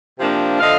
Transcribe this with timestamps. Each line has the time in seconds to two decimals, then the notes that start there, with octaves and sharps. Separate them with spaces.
0.18 C3 F3 A#3 D4
0.60 D3 F3 A3 D#5 F5